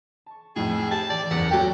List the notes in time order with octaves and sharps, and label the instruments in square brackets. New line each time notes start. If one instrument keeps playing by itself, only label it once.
[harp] A5 C#6
[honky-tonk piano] F2 A2 [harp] D#4 C7 [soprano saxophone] G#4
[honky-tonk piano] G4 [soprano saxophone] A5
[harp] E3 A5 C#7 [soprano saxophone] D5
[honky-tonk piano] F#1 E2 [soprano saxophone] F#5
[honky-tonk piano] F#3 F#4 A4 [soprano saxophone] G4 [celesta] G5